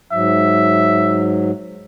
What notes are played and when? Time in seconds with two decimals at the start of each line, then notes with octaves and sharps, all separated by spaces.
0.12 G#2 F#3 E5